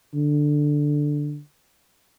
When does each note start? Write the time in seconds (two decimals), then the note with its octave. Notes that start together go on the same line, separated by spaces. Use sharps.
0.14 D3